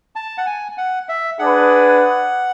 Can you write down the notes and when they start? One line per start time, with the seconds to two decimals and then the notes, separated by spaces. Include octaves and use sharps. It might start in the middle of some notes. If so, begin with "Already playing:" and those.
0.16 A5
0.38 F#5
0.46 G#5
0.78 F#5
1.09 E5
1.39 D4 G#4 B4 F#5